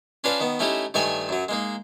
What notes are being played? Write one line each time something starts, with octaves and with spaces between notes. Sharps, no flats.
C#4 D4 F4 B4 D5
D#3 B3
A3 C#4 D#4 E4 G4
G2 D#3 A3 C#5 D5 G#5
F#2 F#3
G#3 A#3 D#4